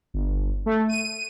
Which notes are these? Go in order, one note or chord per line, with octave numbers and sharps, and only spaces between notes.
G1
A3
D#7